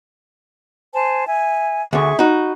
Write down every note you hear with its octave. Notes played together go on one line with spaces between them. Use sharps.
C5 G#5 A5
E5 G#5
D2 D3 G#4 E5 C#6
D#4 F#4 B5